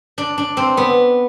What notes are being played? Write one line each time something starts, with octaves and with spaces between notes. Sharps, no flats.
D4
D4
C4
B3